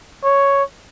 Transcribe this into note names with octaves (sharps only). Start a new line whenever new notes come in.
C#5